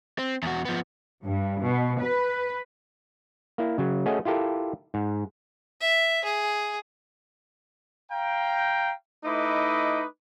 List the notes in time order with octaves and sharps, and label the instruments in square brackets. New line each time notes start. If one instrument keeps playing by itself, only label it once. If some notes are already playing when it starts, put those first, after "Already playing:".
[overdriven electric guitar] C4
E2 F#4
F3 B3
[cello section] G2
B2
B4
[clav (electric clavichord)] A#3 E4
C#3 F#3
A3 C#4 F#4 G#4 C#5 D#5
E4 F4 G4 A4 A#4
G#2
[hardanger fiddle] E5
G#4
[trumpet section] F5 G5 A#5
A3 D#4 E4 B4 D#5 D6